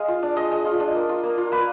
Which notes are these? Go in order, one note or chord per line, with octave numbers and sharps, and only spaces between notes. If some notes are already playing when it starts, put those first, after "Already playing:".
Already playing: G#3 D#5 F5
F4
D4
G#3 D#5
G#3
F4
D4
A#3
F4
A#3
F4
A#3 B4